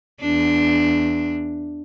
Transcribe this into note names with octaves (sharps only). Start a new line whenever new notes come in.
E2 D4